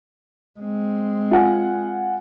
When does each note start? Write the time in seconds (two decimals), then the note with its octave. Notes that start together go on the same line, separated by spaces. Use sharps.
0.60 G#3 C4
1.31 F4 F#5 G#5